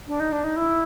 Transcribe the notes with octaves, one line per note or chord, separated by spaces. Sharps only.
D4
D#4
D4
D#4
E4